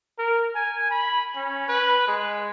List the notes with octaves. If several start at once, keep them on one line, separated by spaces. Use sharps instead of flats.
A#4
G#5
B5
C#4
B4
G#3